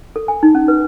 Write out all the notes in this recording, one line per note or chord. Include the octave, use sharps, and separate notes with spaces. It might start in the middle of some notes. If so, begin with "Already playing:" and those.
A4
G#5
D#4
C#4
B4